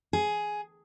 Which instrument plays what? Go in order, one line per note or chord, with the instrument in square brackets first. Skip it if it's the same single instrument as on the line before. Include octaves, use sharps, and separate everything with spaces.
[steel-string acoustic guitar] G#4